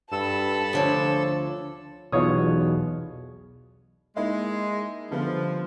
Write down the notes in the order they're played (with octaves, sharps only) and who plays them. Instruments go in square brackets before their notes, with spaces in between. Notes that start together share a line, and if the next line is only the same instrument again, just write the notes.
[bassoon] G2 [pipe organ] A4 E6 [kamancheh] A5 B5
[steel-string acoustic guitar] D2 D4 C#5 [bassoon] F3
[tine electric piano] B1 E2 B2 [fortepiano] F4 C#5 D#6
[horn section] G#3 [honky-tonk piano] A#3 D#4 E4
[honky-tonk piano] D3 G3 B3 [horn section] F3